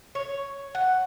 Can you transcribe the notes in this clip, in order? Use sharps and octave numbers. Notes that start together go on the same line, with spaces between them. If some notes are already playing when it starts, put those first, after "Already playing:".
C#5
F#5